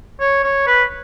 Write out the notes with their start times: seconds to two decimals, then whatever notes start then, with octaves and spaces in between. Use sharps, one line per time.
0.20 C#5
0.44 C#5
0.67 B4